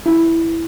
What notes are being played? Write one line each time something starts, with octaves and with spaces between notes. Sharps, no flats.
E4